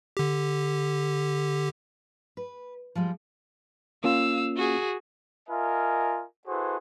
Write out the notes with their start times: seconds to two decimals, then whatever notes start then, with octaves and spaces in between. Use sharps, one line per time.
0.17 D3 G4
2.37 B4
2.95 F3 G3 G#3
4.04 A#3 C#4 F4 F5 E6
4.57 F#4 G#4
5.49 F4 A#4 D#5 E5 G#5
6.48 E4 F#4 G#4 A4 B4 C5